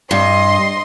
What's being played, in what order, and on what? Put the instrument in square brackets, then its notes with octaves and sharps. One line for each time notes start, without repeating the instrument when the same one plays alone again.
[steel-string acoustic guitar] G2 [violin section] D#5 C6